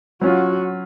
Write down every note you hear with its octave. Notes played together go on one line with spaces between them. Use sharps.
F#3 C#4 F4 F#4